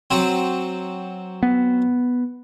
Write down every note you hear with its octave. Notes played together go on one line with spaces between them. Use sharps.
F#3 C4
B3